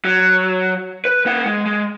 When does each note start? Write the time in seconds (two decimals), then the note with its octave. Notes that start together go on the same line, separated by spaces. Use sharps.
0.05 F#3
1.05 B4
1.26 A#3 F#5
1.46 G#3
1.66 G#3